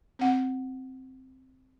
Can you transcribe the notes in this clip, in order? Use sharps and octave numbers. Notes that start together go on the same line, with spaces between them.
C4 F#5